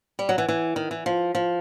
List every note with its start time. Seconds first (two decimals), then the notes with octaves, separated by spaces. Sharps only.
0.19 G3
0.29 F#3
0.38 E3
0.49 E3
0.76 D#3
0.91 E3
1.06 F3
1.35 F3